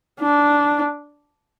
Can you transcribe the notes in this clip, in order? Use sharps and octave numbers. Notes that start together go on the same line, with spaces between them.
D4